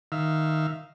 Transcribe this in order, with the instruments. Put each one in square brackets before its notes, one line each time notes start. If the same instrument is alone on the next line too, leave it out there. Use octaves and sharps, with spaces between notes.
[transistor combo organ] D#3 E5 F5